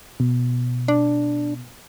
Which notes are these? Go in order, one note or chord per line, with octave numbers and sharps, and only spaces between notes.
B2
D4